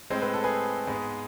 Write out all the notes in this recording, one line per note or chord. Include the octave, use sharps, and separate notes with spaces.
A2 G#3 C4 C5
B4
A4
G#4 B4
G#2 G#3 B3